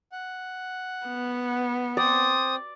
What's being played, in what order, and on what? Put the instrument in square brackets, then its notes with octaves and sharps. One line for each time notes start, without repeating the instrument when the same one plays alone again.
[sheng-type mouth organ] F#5
[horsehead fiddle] B3
[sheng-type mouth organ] C4 C5 [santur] D5 [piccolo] D#6